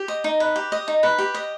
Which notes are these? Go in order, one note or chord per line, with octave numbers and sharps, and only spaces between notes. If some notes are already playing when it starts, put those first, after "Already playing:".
Already playing: G4
D#5
D#4
B4
G4
D#5
D#4
B4
G4
D#5